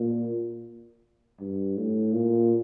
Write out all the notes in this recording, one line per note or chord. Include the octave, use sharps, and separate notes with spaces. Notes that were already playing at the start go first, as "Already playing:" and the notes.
Already playing: A#2
G2
A2
A#2